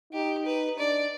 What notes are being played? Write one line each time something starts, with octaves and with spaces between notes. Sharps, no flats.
D#4 G4
B4
D4 D5